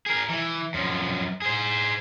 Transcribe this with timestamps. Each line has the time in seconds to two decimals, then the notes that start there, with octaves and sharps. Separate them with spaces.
0.06 G#4 A#4
0.30 E3
0.74 F#2 F3
1.42 G#4 C5